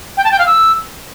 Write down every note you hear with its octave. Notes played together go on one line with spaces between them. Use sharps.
G5
A5
G5
F5
E6